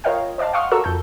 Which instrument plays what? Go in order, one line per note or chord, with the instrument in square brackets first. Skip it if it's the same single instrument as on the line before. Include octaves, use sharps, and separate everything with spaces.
[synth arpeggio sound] F4 A#4 C#5 D#5 F5 G5
C5 D5 D#5 F5 A5
F5 F#5 C6 C#6 D#6 F6
F#4 A4 A#4 A#5 C#6 E6
F2 A4 G6